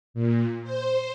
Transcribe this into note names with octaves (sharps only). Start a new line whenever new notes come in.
A#2
C5